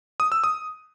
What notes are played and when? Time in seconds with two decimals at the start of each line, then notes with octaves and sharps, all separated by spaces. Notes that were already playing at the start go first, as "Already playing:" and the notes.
0.20 D#6
0.32 E6
0.44 D#6